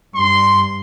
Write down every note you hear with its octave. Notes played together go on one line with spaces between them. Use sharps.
G2 C6